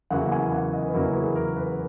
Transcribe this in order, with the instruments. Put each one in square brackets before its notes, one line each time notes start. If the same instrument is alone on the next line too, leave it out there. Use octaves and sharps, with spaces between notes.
[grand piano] E2 C#3 F#3 A#3 E4 F#5
G#5
F#5
D#5
B4
E2 C#3 F#3 A#3 E4 A#4
G#4
A#4
B4